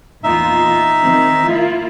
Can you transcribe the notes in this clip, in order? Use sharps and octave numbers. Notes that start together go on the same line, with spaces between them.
E2 A#2 D#4 F4 E5
D#3 C4
A#3 E4 F4